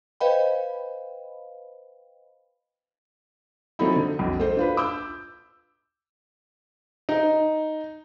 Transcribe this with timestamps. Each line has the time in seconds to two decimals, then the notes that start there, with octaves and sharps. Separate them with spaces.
0.20 B4 C5 D#5 F5 G5 B5
3.79 F3 F#3 A3 C4 D#4 E4
3.96 D3
4.19 B1 F2
4.39 A3 C5
4.57 D4 F4 B4
4.77 D6 E6 G6
7.09 D#4